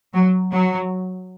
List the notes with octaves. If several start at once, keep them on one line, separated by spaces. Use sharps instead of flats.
F#3
F#3